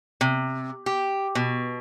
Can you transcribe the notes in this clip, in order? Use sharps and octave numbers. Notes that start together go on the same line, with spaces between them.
C3
G4
B2